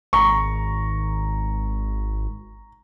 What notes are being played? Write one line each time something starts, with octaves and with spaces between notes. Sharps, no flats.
G#1 A#5 C#6